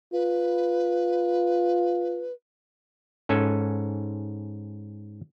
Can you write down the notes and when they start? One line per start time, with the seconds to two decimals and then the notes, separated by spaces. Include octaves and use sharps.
0.13 F4 B4
3.29 G#2 C#4 A4 G#5